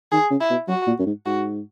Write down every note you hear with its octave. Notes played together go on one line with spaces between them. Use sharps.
D#3 G#4
C#3
E4
B2
F#3 F#4
A#2
F#2
G#2
G#2 F#4